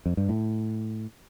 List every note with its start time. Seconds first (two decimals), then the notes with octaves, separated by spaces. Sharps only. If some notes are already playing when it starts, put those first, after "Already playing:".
0.06 F2
0.17 G2
0.29 A2